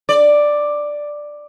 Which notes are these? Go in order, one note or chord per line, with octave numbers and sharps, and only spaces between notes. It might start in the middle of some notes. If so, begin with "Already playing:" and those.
D5